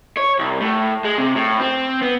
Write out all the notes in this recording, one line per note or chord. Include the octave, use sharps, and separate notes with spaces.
C#5
C2
A2
G#3
C3
A2
C4
B3